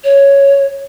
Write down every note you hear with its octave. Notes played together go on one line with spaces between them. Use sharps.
C#5